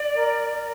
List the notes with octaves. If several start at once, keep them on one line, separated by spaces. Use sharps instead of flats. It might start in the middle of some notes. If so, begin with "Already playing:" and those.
Already playing: D5
A#4
A#4